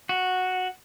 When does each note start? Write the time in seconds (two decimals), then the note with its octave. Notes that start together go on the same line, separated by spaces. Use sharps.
0.09 F#4